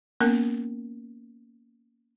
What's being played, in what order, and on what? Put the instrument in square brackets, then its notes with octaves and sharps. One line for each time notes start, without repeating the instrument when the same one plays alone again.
[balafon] A#3 B3 C#4 A#4